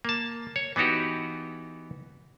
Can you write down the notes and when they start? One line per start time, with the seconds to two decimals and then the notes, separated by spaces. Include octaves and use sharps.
0.05 A#3 A5
0.56 C#5
0.76 E3 B3 D#4 F#4 G4